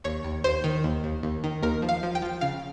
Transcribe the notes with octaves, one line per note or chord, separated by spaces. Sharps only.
D#2 C#5
D#2
D#2 C5
D#3
D#2
D#2
D#2
D#3
D#2 A#4
F3
F5
F3
G5
F3
C#3 F5